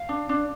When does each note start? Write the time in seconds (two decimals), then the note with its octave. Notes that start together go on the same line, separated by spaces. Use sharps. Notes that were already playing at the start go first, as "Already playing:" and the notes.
Already playing: F5
0.09 D4
0.29 D4